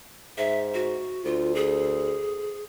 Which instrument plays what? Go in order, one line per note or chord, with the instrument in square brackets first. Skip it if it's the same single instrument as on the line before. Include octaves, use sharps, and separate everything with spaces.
[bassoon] G#2 [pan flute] E5
[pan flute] F#4
[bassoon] D2 [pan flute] F4
[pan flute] G#4